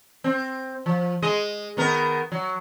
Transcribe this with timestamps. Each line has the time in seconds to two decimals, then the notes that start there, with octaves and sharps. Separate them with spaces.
0.24 C4
0.86 F3
1.22 G#3 D#5
1.77 D#3 B3 A#4
2.32 F#3